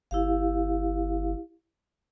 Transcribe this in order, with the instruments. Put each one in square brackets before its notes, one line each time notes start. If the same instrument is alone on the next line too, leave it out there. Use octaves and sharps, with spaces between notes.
[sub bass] G1 [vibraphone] E4 G4 F5